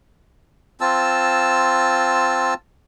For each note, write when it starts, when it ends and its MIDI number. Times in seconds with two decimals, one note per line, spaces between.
0.81 2.54 60
0.81 2.54 65
0.81 2.54 81
0.81 2.54 88